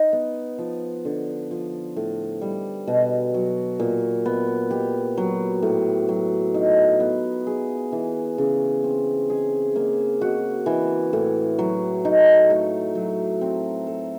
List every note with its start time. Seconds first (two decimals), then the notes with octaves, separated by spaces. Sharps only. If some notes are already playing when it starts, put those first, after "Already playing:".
Already playing: D#4
0.13 B3
0.58 F3
1.05 D3
1.51 F3
1.96 A2
2.41 G3
2.87 B2
3.34 F#3
3.80 A#2
4.26 B3
4.71 G4
5.18 F#3
5.62 A2
6.09 F#3
6.54 D#4
7.00 B3
7.47 G#4
7.92 E3
8.38 C#3
8.84 C4
9.30 G#4
9.76 A#3
10.21 F#4
10.66 E3
11.13 A2
11.59 F#3
12.05 D#4
12.50 A3
12.95 F#3
13.41 C4
13.87 A4